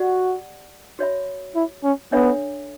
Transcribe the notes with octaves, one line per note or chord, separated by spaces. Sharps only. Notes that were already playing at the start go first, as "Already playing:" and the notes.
Already playing: F#4 G4 D5 F#5
F#4 C#5 E5 B5
E4
C#4
B3 D4 A4 C#5 E5